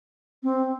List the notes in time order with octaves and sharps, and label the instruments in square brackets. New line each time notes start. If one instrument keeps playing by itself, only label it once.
[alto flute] C4